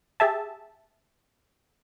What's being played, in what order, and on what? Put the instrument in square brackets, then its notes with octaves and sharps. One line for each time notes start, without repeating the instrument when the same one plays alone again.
[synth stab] G4 G#4 E5 A5